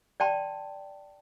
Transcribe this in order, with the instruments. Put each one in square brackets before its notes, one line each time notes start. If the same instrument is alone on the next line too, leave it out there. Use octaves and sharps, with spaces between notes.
[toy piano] D5 G5 A5 C6